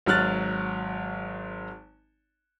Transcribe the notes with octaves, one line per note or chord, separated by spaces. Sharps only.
G#1 F#3 F6 F#6 A6